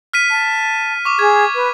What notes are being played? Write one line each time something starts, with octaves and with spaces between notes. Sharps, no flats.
F6 B6 D#7
A5
C#6 D6
G#4 G#6
B4